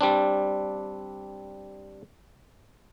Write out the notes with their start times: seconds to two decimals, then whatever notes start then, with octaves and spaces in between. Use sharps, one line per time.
0.01 G3 C4 D4